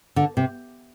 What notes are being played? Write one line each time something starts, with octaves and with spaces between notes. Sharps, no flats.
D3
C3